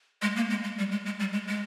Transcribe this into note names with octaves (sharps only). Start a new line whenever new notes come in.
G#3
A#3
G#3
G#3
G3
G#3
G#3
G3
G#3
G#3